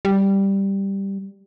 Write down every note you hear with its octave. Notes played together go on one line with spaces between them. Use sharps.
G3